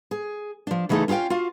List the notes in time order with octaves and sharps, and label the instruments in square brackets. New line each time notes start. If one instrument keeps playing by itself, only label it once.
[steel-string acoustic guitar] G#4
F3 D4
C#3 E3 A3 D#4 G#4 A4
C#4 F4 G#4 F5 G5
F4 F#4 F5